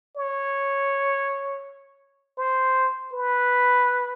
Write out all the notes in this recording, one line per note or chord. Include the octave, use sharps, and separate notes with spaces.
C#5
C5
B4